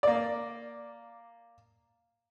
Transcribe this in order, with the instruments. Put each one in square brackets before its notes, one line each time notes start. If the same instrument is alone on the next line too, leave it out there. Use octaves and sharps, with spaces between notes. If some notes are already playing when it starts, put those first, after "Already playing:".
[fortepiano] A#3 D5